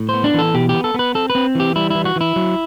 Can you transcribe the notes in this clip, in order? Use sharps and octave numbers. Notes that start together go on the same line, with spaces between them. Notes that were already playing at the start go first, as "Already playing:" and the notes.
Already playing: A2
B3 C5
D4
E3 A4
B2 G4
G4
B3
A4
B3 B4
C4 A4
B4
C4
E3 G4
G3 E4
E3 E4
F#4
E3 E4
F#3